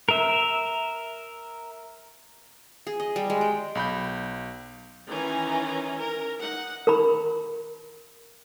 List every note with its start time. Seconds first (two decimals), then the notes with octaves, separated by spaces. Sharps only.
0.09 A#4 E5
2.87 G#4
3.00 D#5
3.16 G3
3.30 G#3
3.41 G5
3.75 B1 B5 G6
5.09 D#3 E3 C#4 G#5 A#5
6.00 A#4
6.41 D#4 F#5
6.87 A#4 A#5 B5